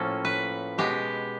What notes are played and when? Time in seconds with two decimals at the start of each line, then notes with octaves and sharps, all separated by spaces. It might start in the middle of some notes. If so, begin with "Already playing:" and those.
Already playing: A2 F3 A#3 C#4 A4
0.25 B4
0.78 B2 G#3 B3 G4